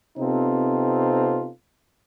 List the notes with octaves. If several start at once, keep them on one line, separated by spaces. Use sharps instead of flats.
C3 B3 C4 D#4 F4 A4